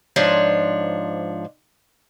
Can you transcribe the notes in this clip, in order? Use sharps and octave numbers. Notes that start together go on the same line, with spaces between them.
G#2 F3 D4 C#5